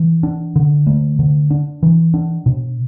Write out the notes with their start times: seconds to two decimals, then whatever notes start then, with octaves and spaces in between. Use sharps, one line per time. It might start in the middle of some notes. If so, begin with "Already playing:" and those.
Already playing: E3
0.23 D4
0.56 D3
0.87 A3
1.19 D3
1.50 D4
1.83 E3
2.14 D4
2.46 B2